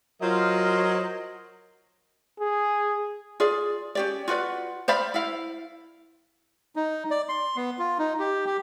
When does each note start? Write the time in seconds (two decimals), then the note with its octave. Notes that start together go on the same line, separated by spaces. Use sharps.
0.21 F#3 F4 A#4 C5 D#5
2.40 G#4
3.40 F4 G#4 D5
3.95 C#4 G4 D5
4.28 F4 F#4 B4 D5
4.88 C5 D5 F5 B5
5.14 E4 F5
6.76 D#4
7.11 D5
7.29 C6
7.56 B3
7.79 F4
7.99 D#4
8.19 G4
8.46 G4